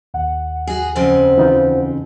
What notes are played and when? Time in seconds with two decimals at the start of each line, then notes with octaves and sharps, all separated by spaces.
0.14 D#2 F#5
0.67 F#4 G#4
0.96 F2 C#3 C4 C5
1.38 E3 D#4 F4